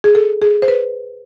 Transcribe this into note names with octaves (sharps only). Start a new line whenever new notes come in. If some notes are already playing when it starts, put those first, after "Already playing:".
G#4
A4
G#4
C5
B4